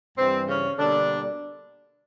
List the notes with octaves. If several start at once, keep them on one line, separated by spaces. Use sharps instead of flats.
G2 E3 G3 C4
C#3 C#4
B2 D3 G3 A#3 D4